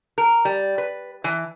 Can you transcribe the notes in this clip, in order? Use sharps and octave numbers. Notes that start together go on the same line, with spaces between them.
A#4
G3
B4
E3